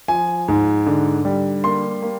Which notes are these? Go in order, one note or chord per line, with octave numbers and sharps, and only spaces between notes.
F3 G#5
G#2
D3
G3
A#3 C6
A#3